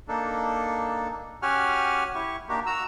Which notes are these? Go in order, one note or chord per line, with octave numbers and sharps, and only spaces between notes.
A#3 D4 D#4 A4
C#4 F#4 G4 F#5 G#5 F6
E4 G4 C#6
A#3 D4 D#4 F#4 G4 A#4
F#4 A#5 E6